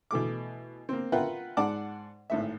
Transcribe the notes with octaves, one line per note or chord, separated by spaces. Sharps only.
B2 E3 A3 D6
A#3 C4
F4 A#4 B4 E5 F#5 G5
G#2 D5 F#5 A5 D6
G#1 A2 E5